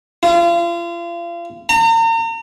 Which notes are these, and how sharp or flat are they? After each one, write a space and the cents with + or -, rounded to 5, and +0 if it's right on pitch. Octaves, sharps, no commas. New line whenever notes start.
F4 -35
A#5 -40